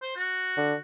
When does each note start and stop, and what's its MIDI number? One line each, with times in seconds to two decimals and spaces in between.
0.02 0.15 72
0.17 0.82 66
0.57 0.74 50